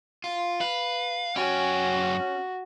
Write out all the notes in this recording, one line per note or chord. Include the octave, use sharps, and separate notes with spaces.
F4
B4 F5
F#2 C#4 F#4 G5